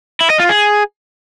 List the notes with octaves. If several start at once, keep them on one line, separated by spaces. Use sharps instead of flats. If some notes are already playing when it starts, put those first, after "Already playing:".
E4
D#5
F4
G#4